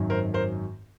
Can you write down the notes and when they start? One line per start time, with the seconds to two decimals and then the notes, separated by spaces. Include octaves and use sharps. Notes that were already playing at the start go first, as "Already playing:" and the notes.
Already playing: G#1 F#2 D#3 F#3
0.10 A#4 C5
0.34 A#4 C5